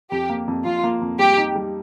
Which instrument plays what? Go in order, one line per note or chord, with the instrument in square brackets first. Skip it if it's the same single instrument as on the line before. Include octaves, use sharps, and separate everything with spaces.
[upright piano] F2 [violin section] G4
[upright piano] A#3
F2
[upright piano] F2 [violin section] F4
[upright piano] A#3
F2
[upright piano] G3 [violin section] G4
[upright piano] D#4
G3